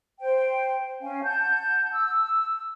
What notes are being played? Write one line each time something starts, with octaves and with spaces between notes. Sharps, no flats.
C5 G5
C#4 F5 G#5
F#5 A5 G6
E6